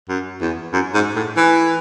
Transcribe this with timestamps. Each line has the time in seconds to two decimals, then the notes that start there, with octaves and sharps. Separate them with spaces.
0.09 F#2
0.41 E2
0.73 F#2
0.94 G#2
1.15 A2
1.37 E3